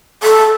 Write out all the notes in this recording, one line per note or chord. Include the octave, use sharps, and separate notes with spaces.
A4